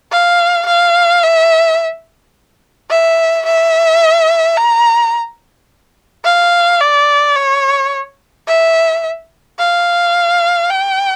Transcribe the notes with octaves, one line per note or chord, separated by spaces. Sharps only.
F5
F5
E5
E5
E5
A#5
F5
D5
C#5
E5
F5
G5